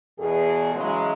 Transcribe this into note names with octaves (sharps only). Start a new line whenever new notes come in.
E2 B2 G#4
C#3 E3 F#3 G#3